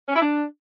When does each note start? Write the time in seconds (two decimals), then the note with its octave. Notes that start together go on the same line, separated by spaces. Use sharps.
0.09 C#4
0.15 E4
0.22 D4